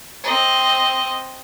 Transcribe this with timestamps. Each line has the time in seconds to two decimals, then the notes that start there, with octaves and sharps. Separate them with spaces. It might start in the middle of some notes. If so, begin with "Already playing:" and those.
0.24 C4 D#5